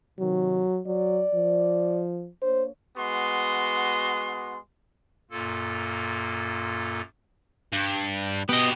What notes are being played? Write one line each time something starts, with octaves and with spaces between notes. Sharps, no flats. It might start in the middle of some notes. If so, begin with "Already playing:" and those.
C3 D#3 F#3
F#3 D5
F3
A#3 D4 C5 C#5
G#3 B3 F#4 C6
F#2 A#2 A#3 F4 A4
G2
B2 B3 G4 D#5